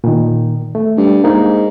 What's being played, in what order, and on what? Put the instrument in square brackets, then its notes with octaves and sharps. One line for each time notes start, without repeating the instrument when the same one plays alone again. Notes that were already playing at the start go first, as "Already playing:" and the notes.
[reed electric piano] A#2 D#3
A3
[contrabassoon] G2
[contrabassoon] G#2 [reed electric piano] A#3 D#4